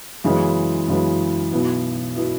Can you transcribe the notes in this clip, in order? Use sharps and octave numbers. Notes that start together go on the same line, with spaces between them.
F#2 C#3 E3 G#3 B3
F#2 C#3 E3 G#3 B3
B1 B2 B3 E4
B2 B3 E4